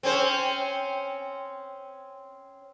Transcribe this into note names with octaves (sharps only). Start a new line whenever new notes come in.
C4 C#4 C5